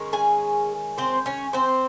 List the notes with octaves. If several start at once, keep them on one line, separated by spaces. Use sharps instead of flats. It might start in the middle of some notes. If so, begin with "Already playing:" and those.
Already playing: D#3 G#3 C#4
G#4 G#5
C4 C5
C#4 C#5
C4 C5